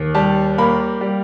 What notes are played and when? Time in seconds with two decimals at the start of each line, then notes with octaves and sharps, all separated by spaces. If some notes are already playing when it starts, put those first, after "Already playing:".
Already playing: D#2
0.15 G3 A5
0.58 A#3 B5
1.01 G3